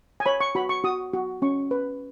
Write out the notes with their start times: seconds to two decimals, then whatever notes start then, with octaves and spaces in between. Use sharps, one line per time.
0.20 G#5
0.26 C#5 B5
0.40 C#6
0.55 F#4 B5
0.69 C#6
0.84 F#4 D#6
1.13 F#4
1.42 C#4 C#6
1.71 B4